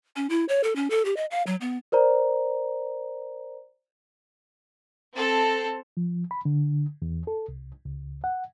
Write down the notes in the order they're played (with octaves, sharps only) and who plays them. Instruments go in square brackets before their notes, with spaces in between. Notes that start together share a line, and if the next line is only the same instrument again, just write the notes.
[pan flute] C#4
E4
C#5
A4
C#4
A4
G4
D#5
F5
F#3
B3
[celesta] A#4 C5 D5 A#5
[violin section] C4 A4
[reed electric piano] F3
B5
D3
E2
A4
C2
C#2
F#5